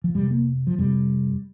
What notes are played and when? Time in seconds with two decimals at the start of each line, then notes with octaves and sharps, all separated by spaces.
0.04 F3
0.14 F2 C3 G3
0.31 A#3
0.67 F3
0.78 F2 C3 G3